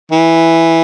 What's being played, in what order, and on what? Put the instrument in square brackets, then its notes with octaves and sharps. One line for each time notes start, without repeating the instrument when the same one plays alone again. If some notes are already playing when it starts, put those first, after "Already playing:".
[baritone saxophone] E3